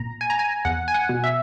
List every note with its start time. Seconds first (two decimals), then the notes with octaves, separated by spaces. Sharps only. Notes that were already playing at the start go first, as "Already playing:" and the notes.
Already playing: A#2 A#5
0.21 G#5
0.30 A#5
0.39 G#5
0.65 E2 F#5
0.88 G#5
0.94 F#5
1.09 B2
1.24 E5